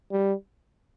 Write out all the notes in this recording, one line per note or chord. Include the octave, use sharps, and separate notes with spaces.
G3